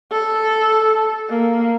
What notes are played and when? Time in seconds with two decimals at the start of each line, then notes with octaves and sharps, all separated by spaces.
0.11 A4
1.29 A#3